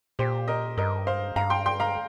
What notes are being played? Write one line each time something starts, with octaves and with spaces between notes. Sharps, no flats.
A#2 G4 C5
A#4 D#5
G2 A#4 D#5
C5 F5
G2 F5 A#5
G5 C6
G5 C6
F5 A#5